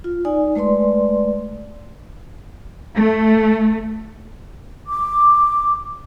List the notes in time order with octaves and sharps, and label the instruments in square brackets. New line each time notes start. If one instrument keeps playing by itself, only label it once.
[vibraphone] F4
D#4 D5 G#5
G#3 A3 B4 D5 C6
[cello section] A3
[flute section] D6